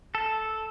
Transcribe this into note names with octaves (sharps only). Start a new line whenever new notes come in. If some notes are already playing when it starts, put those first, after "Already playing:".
A4